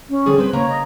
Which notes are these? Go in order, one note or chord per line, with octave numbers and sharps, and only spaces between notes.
C#4
D3 G3 G#4
C4 B4 C5
C#3 A#3 C#5 A#5
D#5